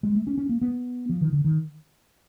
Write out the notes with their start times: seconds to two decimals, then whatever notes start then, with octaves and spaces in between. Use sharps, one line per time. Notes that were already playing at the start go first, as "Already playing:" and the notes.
0.03 G#3
0.15 A3
0.27 C#4
0.38 C#4
0.49 A#3
0.61 B3
1.09 F3
1.21 D#3
1.33 D3
1.45 D#3